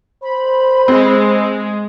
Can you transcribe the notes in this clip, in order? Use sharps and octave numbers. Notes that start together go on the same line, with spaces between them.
C5 B5
G#3 C4